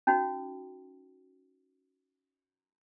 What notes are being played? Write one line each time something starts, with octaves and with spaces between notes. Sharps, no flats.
C#4 D#4 F#4